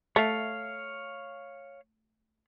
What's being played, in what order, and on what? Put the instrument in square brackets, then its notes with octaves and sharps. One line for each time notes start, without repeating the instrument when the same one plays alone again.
[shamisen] A3 [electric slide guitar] C#5 F5